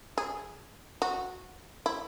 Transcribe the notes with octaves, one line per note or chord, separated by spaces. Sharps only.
G#4
F#4
E4